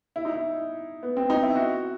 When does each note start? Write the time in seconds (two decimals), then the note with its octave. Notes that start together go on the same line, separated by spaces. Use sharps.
0.16 E4
0.25 D#4
0.34 E4
1.03 B3
1.17 C4
1.30 D#4
1.43 E4
1.55 F#4